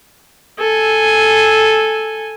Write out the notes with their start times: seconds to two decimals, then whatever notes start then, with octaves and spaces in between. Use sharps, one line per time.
0.59 A4 G#5